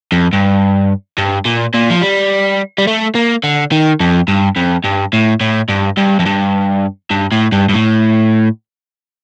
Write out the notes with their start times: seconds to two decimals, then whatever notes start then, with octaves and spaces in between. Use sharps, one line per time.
0.12 F2
0.33 G2
1.18 G2
1.45 A#2
1.74 A#2
1.91 F3
2.02 G3
2.78 G3
2.87 A3
3.15 A#3
3.43 D3
3.72 D#3
4.00 F2
4.28 G2
4.56 F2
4.85 G2
5.13 A2
5.41 A2
5.69 G2
5.97 G2
6.19 F2
6.26 G2
7.11 G2
7.32 A2
7.52 G2
7.69 G2
7.74 A2